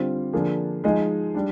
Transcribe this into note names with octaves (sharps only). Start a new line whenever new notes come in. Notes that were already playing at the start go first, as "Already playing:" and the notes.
Already playing: D3 G3 C4 F4 C5
D3 F3 A#3 D4 G#4
F3 G#3 D#4 G#4 D#5
G3 D4